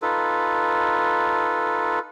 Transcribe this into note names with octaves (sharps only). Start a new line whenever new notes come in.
D#4 F4 A4 B4